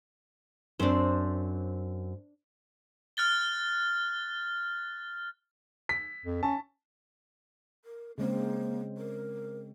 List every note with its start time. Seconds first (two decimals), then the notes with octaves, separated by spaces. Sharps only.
0.80 F#2 C4 D4 C5
3.17 F6 F#6 A6 G7
5.89 B6
6.26 F2
6.43 C#4 A5
7.85 A#4
8.18 C#3 G#3 A#3 C4
8.98 A#4